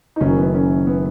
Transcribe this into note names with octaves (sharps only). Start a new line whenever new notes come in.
D#4
F#1 F#2 D#3 F#3 C#4
B3
C#4
B3